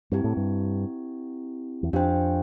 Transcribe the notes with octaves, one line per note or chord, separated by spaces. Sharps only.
G2 C4 E4 G4
A2
G2
E2
F2 D4 G4 C5 G5